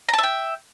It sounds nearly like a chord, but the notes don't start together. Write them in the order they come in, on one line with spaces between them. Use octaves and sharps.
A#5 A5 E5 G5